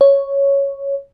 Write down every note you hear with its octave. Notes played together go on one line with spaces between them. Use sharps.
C#5